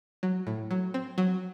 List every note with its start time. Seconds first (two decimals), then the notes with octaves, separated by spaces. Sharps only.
0.23 F#3
0.47 A2
0.71 F#3
0.94 C4
1.18 F#3